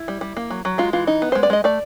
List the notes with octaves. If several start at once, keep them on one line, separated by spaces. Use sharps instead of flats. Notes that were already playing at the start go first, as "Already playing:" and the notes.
Already playing: E4
G3
G3
A#3
F#3
F#3
G#3 F4
E3 F4
D#4
B3
G#3 C5
D5
G#3 D#5
A3 D5